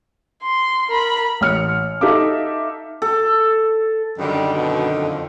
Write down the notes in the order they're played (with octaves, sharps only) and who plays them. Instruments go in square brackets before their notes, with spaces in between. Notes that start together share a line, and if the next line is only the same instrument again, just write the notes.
[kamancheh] C6
A#4 B5
[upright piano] A1 F6 C#7
D#4 G4 A4 E5 F5 D6
[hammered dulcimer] A4
[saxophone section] F#2 D3 D#3 [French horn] G3
[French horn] B2
F2